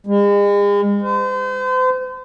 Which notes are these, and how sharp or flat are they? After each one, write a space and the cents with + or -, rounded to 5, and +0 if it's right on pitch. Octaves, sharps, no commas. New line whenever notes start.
G#3 -40
C5 -40